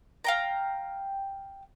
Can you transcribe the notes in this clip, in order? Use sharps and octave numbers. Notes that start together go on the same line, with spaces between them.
F5 G5 A#5